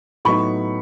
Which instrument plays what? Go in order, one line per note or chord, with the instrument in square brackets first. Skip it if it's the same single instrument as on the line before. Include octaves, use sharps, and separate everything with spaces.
[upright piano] A2 F#3 B3 D#4 B5 C#6